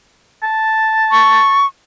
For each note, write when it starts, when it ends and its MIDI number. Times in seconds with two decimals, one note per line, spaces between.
0.43 1.60 81
1.11 1.66 85